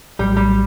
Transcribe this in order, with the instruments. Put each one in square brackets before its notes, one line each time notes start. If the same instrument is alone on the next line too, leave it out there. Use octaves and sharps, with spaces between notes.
[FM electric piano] A#1 A2 F#3 [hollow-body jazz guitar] G3
[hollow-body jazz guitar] G3